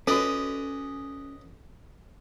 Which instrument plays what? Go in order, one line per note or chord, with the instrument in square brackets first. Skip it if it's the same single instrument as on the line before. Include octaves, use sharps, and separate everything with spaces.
[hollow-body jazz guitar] C#4 [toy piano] F#4 A4 [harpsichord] B4 D5 D#5